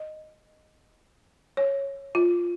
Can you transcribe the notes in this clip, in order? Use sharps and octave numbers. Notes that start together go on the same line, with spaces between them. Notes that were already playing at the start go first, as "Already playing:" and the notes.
Already playing: D#5
C#5
F4